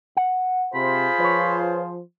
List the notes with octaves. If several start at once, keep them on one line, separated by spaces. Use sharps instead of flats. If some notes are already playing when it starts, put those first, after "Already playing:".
F#5
C3 F4 G#4 C5 B5
F3 B4 C#5